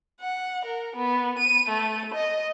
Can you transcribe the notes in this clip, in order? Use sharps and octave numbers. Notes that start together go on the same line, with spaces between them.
F#5
A#4
B3
D#7
A3
D#5